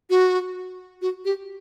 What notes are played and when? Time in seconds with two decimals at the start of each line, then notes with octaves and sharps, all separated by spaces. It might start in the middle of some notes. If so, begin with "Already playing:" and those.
0.10 F#4
1.02 F#4
1.25 G4